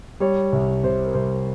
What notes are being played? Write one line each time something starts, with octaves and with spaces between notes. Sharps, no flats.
G3 C#5
C2
C3 C5
A#4
C2 C5